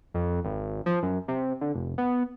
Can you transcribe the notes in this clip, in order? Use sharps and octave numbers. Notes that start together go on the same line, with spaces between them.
F2
G#1
F3
F#2
C3
D3
F1
B3